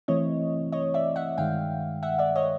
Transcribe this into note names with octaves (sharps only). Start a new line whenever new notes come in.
E3 A3 C4 E4 C#5 D#5
C#5 D#5
D5 E5
E5 F#5
G2 D#3 G#3 F5 G5
E5 F#5
D5 E5
C#5 D#5